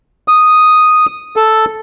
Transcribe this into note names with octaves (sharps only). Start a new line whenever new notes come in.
D#6
A4